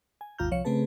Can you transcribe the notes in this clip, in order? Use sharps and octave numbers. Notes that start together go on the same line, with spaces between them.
G#5
G#1 D#2 F4 A#5 F6 G6
C2 F3 C#5 F5 C#7
C#3 A3 C4 G#4 B4 A5